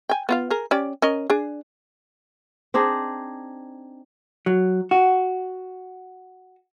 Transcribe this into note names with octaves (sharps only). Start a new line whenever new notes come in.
G5 G#5
B3 F4 F5
G#4 A#4
C#4 G4 D5
C#4 A#4 D#5
D4 G#4
C4 D4 D#4 G#4
F#3
F#4